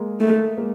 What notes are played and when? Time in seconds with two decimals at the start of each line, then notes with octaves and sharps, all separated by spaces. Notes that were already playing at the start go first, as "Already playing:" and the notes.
Already playing: G#3 A#3
0.20 A3
0.57 G#3 A#3